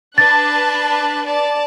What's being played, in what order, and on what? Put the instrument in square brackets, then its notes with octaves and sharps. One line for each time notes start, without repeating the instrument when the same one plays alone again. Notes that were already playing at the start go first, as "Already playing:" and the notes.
[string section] D4 B4 [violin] A5 F#6 [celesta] A6
[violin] D5 A5